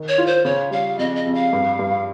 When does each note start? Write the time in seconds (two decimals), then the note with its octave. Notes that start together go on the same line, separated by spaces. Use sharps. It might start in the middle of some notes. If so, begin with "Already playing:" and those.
Already playing: D#3
0.08 C#5
0.18 F4
0.27 C5
0.45 C#3 C#5
0.71 G3 F5
0.98 F2 D#5
1.16 D#5
1.26 F2
1.35 F5
1.53 G2
1.79 G2